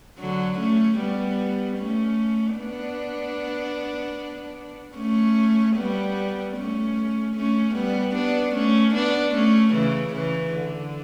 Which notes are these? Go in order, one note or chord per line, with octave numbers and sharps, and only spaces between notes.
D3 F#3
A3 C#4
G3 B3
A3 C#4
B3 D4
A3 C#4
G3 B3
A3 C#4
A3 C#4
G3 B3
B3 D4
A3 C#4
B3 D4
A3 C#4
C#3 E3
C#3 E3
D3